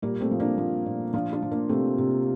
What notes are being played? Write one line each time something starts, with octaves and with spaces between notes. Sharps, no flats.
A#2 G3 A#3
A3 C4
F3
A#3 D4
F3
A#2
F3 D4 F4
D4 F4
F3
A#3 D4
C3 A3 C4
C3